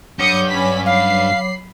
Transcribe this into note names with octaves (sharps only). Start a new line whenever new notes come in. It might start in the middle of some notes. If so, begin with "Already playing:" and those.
G2 F#3 C#5 D6 D#6 G6 C#7
C#4 B5 B6
F5 B5 C7